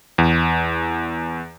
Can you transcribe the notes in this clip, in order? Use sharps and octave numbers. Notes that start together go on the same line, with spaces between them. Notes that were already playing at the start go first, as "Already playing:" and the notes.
E2